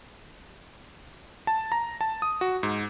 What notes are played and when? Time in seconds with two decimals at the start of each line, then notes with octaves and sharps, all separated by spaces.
1.47 A5
1.72 A#5
2.01 A5
2.22 D#6
2.41 F#4
2.63 G#2